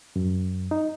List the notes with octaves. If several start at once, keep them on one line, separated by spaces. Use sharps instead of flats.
F#2
D#4